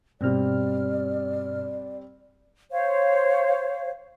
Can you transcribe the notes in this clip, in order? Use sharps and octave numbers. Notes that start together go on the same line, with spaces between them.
G2 B2 G3 C4 D5 F6
C5 C#5 F5